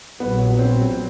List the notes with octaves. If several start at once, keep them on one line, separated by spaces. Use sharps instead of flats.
A#1 A#2 F#3 B3
C4